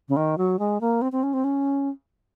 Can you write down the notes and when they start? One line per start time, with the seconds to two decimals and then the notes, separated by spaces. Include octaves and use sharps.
0.09 C#3
0.16 D#3
0.38 F#3
0.59 G#3
0.81 A#3
1.02 C4
1.12 C4
1.23 C#4
1.34 C4
1.44 C#4